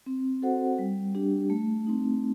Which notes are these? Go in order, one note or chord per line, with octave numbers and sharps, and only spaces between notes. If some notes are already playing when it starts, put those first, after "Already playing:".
C4
F#4 A4 C5 F#5
G3
D4 G4
A3
C4 D#4